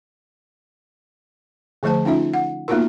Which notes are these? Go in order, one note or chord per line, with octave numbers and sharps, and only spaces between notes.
D3 F3 A3 C5 A5
C#4 D#4 F4 E5
F#5
A#3 B3 D#4 F4 F#4 A#4